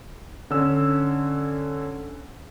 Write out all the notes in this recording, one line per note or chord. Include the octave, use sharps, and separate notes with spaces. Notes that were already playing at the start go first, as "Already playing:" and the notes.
D3 C#4 E6